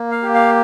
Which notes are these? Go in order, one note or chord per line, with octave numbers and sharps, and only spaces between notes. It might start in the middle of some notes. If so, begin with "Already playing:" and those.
Already playing: A#3
F5
G4
F5